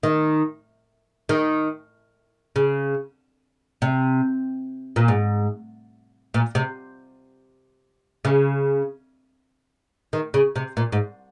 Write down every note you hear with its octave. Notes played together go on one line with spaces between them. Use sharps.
D#3
D#3
C#3
C3
A#2
G#2
A#2
C3
C#3
D#3
C#3
C3
A#2
G#2